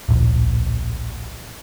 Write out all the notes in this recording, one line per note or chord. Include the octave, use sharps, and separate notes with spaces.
D1 A#1